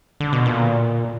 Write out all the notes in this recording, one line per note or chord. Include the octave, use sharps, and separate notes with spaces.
D3
B2
A#2